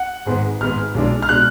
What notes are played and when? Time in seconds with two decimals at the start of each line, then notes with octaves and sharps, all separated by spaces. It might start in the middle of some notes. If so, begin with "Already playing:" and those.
Already playing: F#5
0.26 G#1 G#2 G#3 B3
0.60 G#1 G#2 G#3 B3 F6
0.95 B1 B2 G#3 D4
1.22 F6
1.29 B2 G#3 D4 F#6